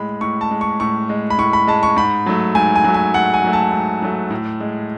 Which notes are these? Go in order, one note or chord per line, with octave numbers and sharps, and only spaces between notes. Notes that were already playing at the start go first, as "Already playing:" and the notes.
Already playing: A2 G#3 B5
A2 C#6
A5
G#3
C#6
A2 C#6
G#3
B5
A2 C#6
B5
G#3 A5
C#6
G#2 B5
F#3 A3
G#2 G#5
G#5
F#3 A3
G#5
G#2 F#5
G#5
F#3 A3
A5
G#2
F#3 A3
A2
G#3